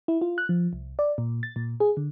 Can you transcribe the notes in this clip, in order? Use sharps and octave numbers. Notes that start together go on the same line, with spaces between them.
E4
F4
F#6
F3
C2
D5
A#2
A6
A#2
G#4
D3